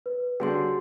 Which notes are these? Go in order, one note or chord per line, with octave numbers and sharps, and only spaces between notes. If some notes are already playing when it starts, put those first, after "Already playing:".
B4
D3 G3 C#4 F#4 G#4 C6